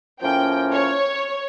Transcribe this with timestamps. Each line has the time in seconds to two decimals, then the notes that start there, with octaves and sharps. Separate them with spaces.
0.21 A2 F3 A#3 C#4 G5
0.73 C#5